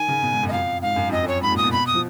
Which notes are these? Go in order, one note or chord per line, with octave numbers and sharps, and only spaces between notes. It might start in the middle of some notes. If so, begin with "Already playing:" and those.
Already playing: D#3 G#5
C#3
B2
G#2
F#2
D#5
F2 F5
G#2 F5
F#2
F2 D#5
F#2 C#5
G#2 B5
A#2
D#6
B2
B5
D#6
F3